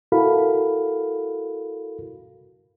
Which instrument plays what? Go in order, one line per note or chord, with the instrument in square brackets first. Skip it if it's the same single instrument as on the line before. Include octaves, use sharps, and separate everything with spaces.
[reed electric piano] E4 F#4 A4 A#4 F5 B5